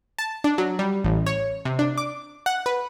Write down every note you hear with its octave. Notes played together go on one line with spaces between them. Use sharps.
A5
D4
F#3
G3
A1
C#5
C3
D4
D6
F#5
B4